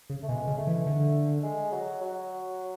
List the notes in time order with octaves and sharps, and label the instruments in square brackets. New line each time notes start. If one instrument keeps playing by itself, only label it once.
[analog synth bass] C#3
[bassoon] A3
[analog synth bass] B2 [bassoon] G#3
[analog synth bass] C#3
[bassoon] A3
[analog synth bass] E3
D3
[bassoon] G#3
F#3
F#3